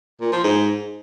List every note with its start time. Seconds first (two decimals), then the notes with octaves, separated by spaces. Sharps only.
0.21 A#2
0.32 F3
0.44 G#2